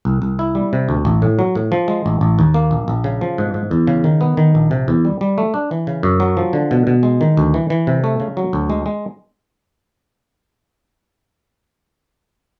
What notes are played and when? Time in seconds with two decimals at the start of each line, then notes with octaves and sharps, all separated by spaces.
0.05 C2
0.22 C2
0.39 E4
0.55 G3
0.73 C3
0.89 D2
1.05 A1
1.22 A2
1.39 F#3
1.55 A2
1.72 F3
1.88 G#3
2.06 A1
2.21 A1
2.39 D#2
2.54 A#3
2.71 A#1
2.88 A#1
3.04 C#3
3.21 F3
3.38 G#2
3.54 G#2
3.71 E2
3.87 C#3
4.04 D#3
4.21 B3
4.37 D#3
4.55 A#1
4.71 C3
4.88 E2
5.05 G3
5.21 G3
5.38 A3
5.54 D4
5.71 E3
5.87 C#3
6.03 F#2
6.20 F#3
6.37 F3
6.53 D3
6.71 B2
6.87 B2
7.03 G#3
7.21 D#3
7.37 D2
7.54 E3
7.70 E3
7.87 C3
8.04 A3
8.20 C#3
8.37 F#3
8.53 D2
8.70 G#3
8.86 G#3